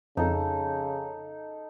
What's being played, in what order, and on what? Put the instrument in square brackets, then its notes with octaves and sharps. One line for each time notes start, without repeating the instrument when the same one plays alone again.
[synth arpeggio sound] F2 [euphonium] C#3 [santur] D#4 A4